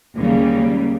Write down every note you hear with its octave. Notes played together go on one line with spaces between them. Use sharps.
D#2 C#3 G3 A#3